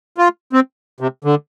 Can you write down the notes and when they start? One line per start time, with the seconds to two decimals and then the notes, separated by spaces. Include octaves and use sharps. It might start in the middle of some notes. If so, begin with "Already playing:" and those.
0.18 F4
0.53 C4
1.00 C3
1.24 D3